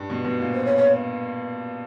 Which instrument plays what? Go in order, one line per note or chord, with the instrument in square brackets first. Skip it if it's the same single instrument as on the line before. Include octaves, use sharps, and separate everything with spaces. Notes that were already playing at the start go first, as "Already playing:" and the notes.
Already playing: [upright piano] G2
B2
B2
A#2
[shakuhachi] C5
C#5
C#5